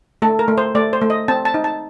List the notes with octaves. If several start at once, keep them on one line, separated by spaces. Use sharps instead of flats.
A3 A4
A#4
A3
C5
A3 D5
C5
A3
D#5
C4 A5
A5
D#4
A5